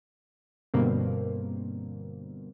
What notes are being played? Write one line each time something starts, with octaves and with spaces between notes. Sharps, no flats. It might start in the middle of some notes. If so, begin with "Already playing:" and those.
G2 B2 D3 A#3 C4